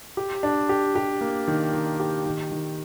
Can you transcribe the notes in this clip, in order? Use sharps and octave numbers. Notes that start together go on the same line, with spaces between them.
G4
D4
G4
G4
A#3
D#3
D#3
G4
D#3
D#3